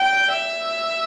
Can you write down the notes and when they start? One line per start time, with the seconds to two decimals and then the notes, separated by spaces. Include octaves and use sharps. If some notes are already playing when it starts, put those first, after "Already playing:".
Already playing: G5
0.32 E5